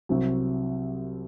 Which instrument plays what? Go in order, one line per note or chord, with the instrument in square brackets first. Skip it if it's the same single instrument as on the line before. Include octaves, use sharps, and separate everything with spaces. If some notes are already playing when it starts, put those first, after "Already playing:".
[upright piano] C2 C3 F#3 C4